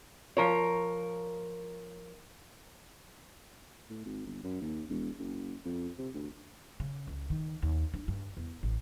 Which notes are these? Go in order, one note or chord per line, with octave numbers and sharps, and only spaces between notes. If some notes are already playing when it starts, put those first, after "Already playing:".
F3 A#4 C#5
A2
G#1
G1
F#2
D#2
E1
F#1
F2
C3
D2
C#3
C#2
D#3
D#2
D4
G2
E2
A1